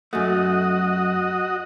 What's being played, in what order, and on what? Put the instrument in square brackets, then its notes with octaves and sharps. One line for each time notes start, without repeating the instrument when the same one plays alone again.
[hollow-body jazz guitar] F#2 A3 [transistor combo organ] F#4 D#5